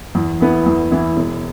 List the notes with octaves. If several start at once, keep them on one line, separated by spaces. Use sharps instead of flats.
E2
E3 B3 E4
E2
E3 B3 E4
E1